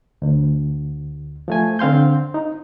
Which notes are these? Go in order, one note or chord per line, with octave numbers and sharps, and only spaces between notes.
D2
F3 A3 G#5
D3 C4 F5 C6 G6
D#4